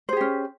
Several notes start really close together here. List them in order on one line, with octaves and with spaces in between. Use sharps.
C5 G#4 G4 C#4